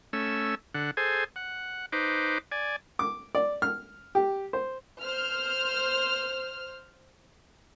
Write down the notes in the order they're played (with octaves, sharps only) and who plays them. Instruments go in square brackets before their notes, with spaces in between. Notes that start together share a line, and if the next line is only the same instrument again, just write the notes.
[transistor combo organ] A3 C#4 E6
D3 F#5
G#4 A4 C5 G#5
F#5
D#4 B4 C5 D6
D5 G#5
[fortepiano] D6
D5
F6
G4
C5
[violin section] C5 F6